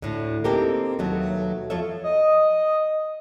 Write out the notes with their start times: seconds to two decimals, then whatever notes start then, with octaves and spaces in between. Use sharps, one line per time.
0.02 D2 A2 D3
0.44 A#3 C4 D#4 G4 A4 A#4
0.99 D#2 B2 F#3 A3 B3
1.70 F2 F3 F4 A4 C#5 E5
2.04 D#5